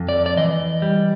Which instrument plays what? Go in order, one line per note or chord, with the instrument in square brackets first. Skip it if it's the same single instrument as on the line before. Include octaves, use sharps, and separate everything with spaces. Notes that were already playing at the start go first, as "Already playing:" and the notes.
Already playing: [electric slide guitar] F2
D5
D5
E3 D#5
G3